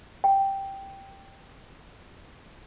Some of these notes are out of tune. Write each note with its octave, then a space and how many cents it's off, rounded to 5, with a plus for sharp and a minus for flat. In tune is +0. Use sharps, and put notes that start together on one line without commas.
G5 +0